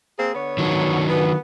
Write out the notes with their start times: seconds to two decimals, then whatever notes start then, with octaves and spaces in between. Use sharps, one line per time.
0.17 A#3 C4 G#4
0.33 D3 B3 C#5
0.59 D#3 F#3 D4
1.08 B3